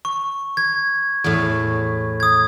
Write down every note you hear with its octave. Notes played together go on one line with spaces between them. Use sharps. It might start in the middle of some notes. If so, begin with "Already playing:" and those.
C#6
G#6
E2 A2
D#6 G#6